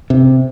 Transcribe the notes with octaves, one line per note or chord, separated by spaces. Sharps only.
C3